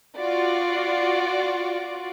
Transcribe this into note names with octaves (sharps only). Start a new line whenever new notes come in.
F4 F#4 D5